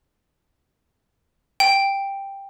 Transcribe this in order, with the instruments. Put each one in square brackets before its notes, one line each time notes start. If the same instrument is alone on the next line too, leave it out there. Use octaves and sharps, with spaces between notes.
[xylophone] G5